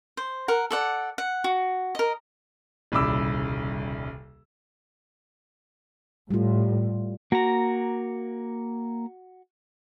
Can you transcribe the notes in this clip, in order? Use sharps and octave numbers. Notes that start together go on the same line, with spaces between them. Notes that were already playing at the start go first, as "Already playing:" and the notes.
C5
A#4 F#5
A4 D5 F#5
F#5
F#4
A#4 D#5
D#1 C2 C#3 B5 D6 E6
A2 G3 F4
A#3 F#4 A#5